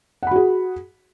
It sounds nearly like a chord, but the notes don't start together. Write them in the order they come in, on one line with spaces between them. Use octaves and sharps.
F#5 B5 F#4 G#4